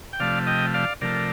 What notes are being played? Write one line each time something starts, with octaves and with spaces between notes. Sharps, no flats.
G5
C3 F3 A3 D5 F5
D#5 G5
D5 F5
C3 F3 A3 A#4 D5